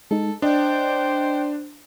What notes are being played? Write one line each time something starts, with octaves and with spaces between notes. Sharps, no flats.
G#3 D#4 A4
D4 C5 D#5 G5